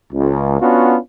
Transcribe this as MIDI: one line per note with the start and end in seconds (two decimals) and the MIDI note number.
0.11 0.57 37
0.61 0.97 59
0.61 0.97 61
0.61 0.97 62
0.61 0.97 65
0.61 0.97 66